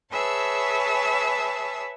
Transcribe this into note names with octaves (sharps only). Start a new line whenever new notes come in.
G#4 B4 C#5 E5 A5 E6